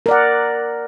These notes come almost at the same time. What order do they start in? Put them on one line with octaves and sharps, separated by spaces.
A#4 D5 F#5